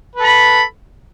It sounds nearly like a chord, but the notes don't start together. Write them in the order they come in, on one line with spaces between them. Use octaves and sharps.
B4 A4 B5